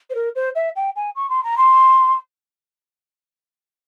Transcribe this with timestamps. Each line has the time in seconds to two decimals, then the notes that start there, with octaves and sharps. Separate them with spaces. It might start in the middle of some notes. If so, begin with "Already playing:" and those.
0.10 C5
0.15 A#4
0.35 C5
0.55 E5
0.75 G5
0.96 G#5
1.15 C#6
1.29 C6
1.43 A#5
1.57 C6